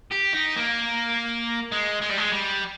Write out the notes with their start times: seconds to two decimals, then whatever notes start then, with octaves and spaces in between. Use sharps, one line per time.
0.12 G4
0.34 D#4
0.57 A#3
1.72 G#3
2.02 G#3
2.10 G3
2.18 G#3
2.32 G3